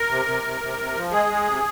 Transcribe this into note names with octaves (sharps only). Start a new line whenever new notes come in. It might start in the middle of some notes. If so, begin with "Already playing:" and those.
Already playing: A#4
C3
C3
C3
C3
C3
F3
G#3 G#4
G#3
C3